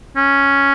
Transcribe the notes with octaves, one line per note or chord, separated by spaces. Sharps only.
C#4